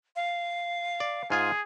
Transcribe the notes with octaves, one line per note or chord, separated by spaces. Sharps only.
F5
D5
G#2 F4 G#4 G#5